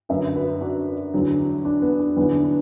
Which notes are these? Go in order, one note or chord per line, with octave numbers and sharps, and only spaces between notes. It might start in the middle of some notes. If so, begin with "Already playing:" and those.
F#2 D3 F#3 B4 E5
F#4 B4
D4 F#4
E2 D3 F#3
D4
B3
D4
E2 D3 F#3 B3
D4